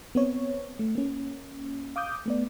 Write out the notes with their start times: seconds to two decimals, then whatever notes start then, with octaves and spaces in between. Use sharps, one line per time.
0.15 B3 C4 C#5
0.79 A3
0.95 A#3 C#4
1.96 F5 D6 D#6 G6
2.26 A3 B3 D5